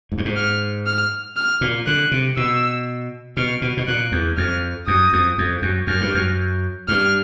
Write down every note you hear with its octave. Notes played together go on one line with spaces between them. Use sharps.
G#2
G2
G#2
F6
F6
F6
A#2
D3 F#6
C3
B2 E6
B2 F6
B2
B2
A#2 F#6
E2
F2 F6
F#2 D#6
F2
F2
F#2
F#2 F6
G2
F#2
G2 F6